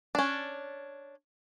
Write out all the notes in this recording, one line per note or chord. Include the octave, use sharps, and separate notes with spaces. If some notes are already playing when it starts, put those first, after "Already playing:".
C#4 D4